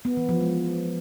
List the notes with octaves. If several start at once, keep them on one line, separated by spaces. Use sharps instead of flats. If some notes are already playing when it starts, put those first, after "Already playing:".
B3
E3
F3
G#3